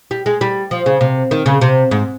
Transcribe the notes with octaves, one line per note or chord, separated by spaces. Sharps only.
G3
G#3
G3
F3
C#3
C3
D#3
C#3
C3
G#2